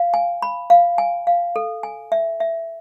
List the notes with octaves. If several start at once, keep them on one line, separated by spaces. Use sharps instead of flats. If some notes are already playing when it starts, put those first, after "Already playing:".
Already playing: F5
G#5
B5
F5
G#5
F5
A4
G#5
E5
E5